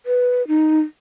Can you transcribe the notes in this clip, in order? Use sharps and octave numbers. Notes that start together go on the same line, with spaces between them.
B4
D#4